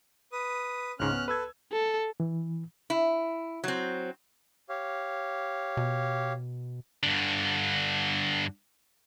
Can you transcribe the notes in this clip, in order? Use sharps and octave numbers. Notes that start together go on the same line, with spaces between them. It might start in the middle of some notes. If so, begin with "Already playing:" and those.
B4 D#6
C#2 G#2 C#3 C#4 F6 F#6
B3
A4 B4 E6 G#6
A4
E3
E4
F#3 C4
G4 C#5 F5
B2
G2 D3